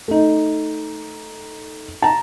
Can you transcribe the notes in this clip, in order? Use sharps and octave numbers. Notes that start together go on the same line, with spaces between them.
A3 D#4
A5 A#5